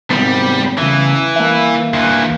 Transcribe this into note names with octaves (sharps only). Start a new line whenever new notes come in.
G#2 C3 G3 B3
E2 C#3 E3
A#3 E5
D2 E3